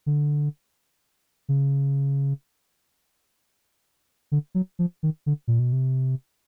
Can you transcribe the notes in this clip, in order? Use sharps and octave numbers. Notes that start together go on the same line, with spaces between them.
D3
C#3
D3
F#3
F3
D#3
D3
A#2
B2
C3